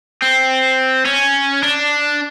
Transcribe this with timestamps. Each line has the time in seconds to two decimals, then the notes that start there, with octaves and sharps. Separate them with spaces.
0.22 C4
1.06 C#4
1.63 D4